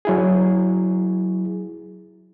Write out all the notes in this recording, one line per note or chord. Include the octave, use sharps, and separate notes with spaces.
F#3 E4 G#4